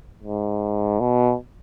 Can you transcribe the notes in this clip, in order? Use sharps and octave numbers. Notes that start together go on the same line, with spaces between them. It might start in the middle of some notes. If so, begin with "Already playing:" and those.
G#2
B2